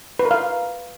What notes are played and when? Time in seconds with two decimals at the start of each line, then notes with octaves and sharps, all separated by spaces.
0.19 B4
0.25 A#4
0.31 F5